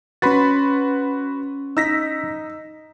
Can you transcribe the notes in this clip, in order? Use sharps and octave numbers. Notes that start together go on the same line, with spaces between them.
C#4 F#4 B4 B5 C6 A6
D#4 E6 A#6 B6